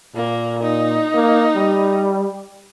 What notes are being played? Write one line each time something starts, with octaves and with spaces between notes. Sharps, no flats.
A#2 A#3
D#4
A#3
G3